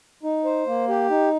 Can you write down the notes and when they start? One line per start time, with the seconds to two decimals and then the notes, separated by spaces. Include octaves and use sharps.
0.23 D#4
0.45 C5
0.67 A#3
0.88 G4
1.10 D#4